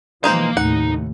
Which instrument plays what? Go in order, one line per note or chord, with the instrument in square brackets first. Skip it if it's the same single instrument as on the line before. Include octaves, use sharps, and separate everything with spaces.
[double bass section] B2 E3 F3 [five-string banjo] G#3 D#4 C5 [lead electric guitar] A#3 F5
[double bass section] D#2 A2 C3 [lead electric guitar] D#4 [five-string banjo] F#5